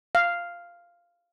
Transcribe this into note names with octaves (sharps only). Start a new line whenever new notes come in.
F5